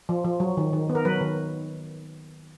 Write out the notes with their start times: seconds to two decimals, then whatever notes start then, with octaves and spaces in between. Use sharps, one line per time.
0.09 F3
0.25 F3
0.40 F#3
0.57 D#3
0.73 D#3
0.89 B3
0.95 A#4
1.05 F#3 B4
1.21 D#3